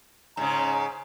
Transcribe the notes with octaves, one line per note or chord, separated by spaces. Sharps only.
G#2 C#3 A#5